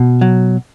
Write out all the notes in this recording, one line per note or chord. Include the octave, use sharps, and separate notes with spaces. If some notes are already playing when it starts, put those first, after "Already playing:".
Already playing: B2
F#3